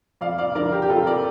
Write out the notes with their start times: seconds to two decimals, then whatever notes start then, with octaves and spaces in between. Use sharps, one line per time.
0.21 F2 D5 F5
0.38 D5 F5
0.55 D3 F3 A#4 D5
0.72 G4 A#4
0.82 G4
0.89 F2 F4 A4
1.06 A#4 D5